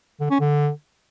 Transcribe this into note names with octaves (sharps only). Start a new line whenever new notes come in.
D3
C#4
D3